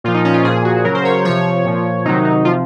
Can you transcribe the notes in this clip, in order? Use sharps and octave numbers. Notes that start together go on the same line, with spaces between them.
A#2 F3 F4
D#4
C#4
F4
A#2 F3 G#4
F#4
C#3 F#3 A#4
C5
C#5
C3 F3 C#5
A#2 F3
C3 D#3 F#3 D#4
D#4
C3 F3 F4